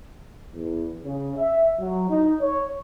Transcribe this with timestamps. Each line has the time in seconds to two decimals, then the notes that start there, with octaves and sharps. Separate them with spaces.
0.53 E2
1.04 C#3
1.37 E5
1.80 F#3
2.10 D#4
2.41 C#5